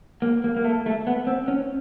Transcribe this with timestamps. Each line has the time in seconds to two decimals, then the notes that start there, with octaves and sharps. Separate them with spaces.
0.22 A#3
0.44 A#3
0.57 A#3
0.64 A3
0.86 A3
1.07 B3
1.27 C4
1.48 C#4